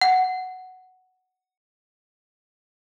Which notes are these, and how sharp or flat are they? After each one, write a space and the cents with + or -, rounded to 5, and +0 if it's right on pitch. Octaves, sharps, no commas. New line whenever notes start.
F#5 +5